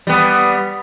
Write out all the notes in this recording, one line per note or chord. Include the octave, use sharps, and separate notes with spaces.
G3 B3